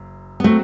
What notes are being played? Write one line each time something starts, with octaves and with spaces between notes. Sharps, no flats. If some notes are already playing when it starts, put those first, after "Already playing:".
Already playing: F#1 F#2
B3
F#3 A3 C4 F#4